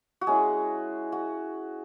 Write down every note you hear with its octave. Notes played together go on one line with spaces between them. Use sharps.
F#4
G#3 C#4 E4 G#4
F#4